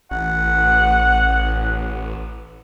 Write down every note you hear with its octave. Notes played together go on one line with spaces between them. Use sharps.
A1 F#5